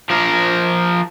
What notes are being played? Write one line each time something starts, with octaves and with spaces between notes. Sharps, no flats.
F3 A#4